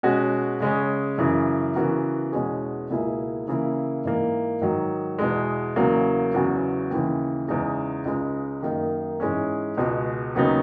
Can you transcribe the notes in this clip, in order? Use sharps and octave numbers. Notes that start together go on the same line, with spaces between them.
B2 G#3 C#4 F#4
C#3 G#3 C#4
F#2 C#3 E3
C#3 E3 B3 F#4 A#4
E2 B2 G#3 C#4 G#4
C#2 B2 A#3 E4 G#4
C#3 E3 A#3 E4
G#2 E3 A#3
G#2 D#3 F#3
E2 B2 G#3
E2 C#3 F#3 A#3
E2 C#3 F#3 B3 F#4
D#2 C#3 E3
E2 C#3 G#3 D#4 G#4
C#2 C#3 G#3 D#4
F#2 D#3 A#3 D#4
G#2 E3 G#3 C#4
C#2 B2 G#3
D#2 C#3 F#3 B3 D#4